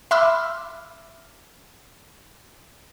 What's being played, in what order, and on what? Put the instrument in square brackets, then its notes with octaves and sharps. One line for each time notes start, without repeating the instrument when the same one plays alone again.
[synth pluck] E5 B5 C6 D6 E6 F6